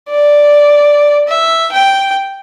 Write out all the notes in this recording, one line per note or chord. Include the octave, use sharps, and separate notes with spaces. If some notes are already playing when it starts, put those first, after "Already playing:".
D5
E5
G5